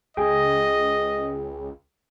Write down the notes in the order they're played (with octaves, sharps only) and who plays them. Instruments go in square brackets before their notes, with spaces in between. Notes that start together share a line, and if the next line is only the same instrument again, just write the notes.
[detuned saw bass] C#2 [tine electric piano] G#4 G5 [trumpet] D#5